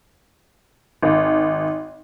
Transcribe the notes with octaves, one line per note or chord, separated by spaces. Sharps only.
G#1